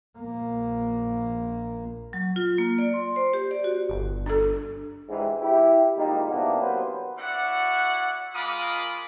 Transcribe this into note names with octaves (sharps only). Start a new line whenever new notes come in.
A#1 A#3
F#3
F4
A#3
D5
C6
C5
G4
D5
F#4
G1
D4 A4
G#2 E3 G3
E4 G4
G#1 A#2 G3 D#4
C3 E3 A#3 B3 D4 G4
F#3 A#3 B3 B4 C5
E4 F#4 D5 F#5
G#3 F4 A#4 B5 D6 D#6